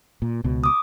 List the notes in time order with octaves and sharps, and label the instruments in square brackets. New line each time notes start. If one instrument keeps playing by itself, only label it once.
[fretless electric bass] A#2
C#2 B2
[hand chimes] D6 D#6